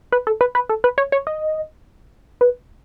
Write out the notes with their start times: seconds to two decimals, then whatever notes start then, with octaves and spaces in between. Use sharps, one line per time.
0.12 B4
0.27 A4
0.41 B4
0.55 B4
0.69 A4
0.84 B4
0.98 C#5
1.12 C#5
1.27 D#5
2.41 B4